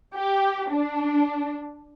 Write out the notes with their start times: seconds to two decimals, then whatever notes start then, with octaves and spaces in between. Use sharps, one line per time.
0.14 G4
0.70 D4